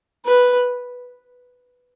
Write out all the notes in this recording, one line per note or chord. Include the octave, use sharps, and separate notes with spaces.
B4